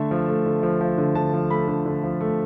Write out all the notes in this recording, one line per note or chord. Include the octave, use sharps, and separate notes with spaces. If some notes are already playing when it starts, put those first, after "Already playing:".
Already playing: D3 A3 E5
F3
A3
D3
F3
F3
D3
D3 A5
F3
A3 B5
D3
D3
F3
A3